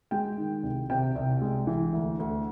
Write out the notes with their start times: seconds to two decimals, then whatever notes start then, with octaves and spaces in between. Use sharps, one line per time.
0.11 G#3 G5
0.37 D#3
0.63 C2
0.90 C3 G5
1.15 C2
1.42 G#3
1.67 E3
1.93 D2
2.19 D2